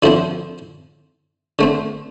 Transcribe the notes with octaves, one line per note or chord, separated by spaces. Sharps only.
D3 F3 C4 E4
D3 A3 C4